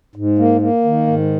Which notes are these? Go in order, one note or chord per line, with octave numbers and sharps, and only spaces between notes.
G#2
A#3
A#3
D#3
G#2